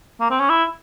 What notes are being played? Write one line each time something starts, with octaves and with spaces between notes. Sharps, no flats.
A#3
C4
C#4
E4